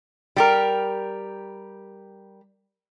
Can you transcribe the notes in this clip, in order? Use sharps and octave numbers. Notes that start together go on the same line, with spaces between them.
G3 G4 A#4